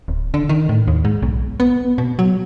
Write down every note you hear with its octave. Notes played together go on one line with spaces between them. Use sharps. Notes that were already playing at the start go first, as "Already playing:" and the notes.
D1
D3
D#3
A2
D#2
G#2
B1
B3
B2
F#3